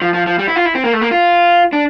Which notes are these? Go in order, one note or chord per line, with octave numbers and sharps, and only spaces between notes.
F3
F3
F3
G3
E4
F4
E4
C4
A#3
A3
A#3
F4
D4